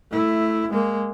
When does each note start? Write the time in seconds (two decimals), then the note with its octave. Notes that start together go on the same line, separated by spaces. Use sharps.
0.11 A3 E4
0.71 G#3 A#3